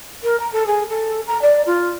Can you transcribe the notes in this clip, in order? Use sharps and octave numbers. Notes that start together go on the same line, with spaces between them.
A#4
A#5
A4
G#4
A4
A#5
D5
F4